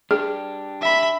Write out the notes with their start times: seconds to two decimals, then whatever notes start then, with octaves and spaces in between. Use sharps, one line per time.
0.11 D4 G4 G#4
0.81 E5 B5